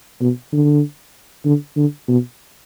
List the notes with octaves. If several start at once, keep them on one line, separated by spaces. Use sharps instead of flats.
B2
D3
D3
D3
B2